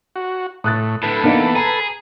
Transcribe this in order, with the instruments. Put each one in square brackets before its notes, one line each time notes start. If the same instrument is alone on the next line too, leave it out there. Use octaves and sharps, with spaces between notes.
[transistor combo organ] F#4
[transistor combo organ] A2 [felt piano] D#6 F#6 A6
[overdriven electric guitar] A2 D3 [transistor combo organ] A4 B4
[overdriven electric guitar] E2 [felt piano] A#3 D4 D#4
[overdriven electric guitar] G#4 [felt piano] A#5